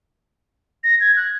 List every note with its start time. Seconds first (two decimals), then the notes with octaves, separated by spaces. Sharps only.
0.84 A#6
1.00 G#6
1.17 F#6